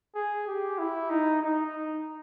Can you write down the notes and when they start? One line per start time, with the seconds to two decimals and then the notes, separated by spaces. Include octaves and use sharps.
0.15 G#4
0.47 G4
0.79 E4
1.10 D#4
1.42 D#4